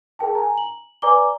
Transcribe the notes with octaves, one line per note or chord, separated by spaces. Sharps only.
G#4 A#4 G5 A5
G#5 A#5
F#7
B4 D5 G#5 A#5 D6 G7